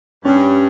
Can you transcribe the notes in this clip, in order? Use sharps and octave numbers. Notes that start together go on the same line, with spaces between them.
G2 C#4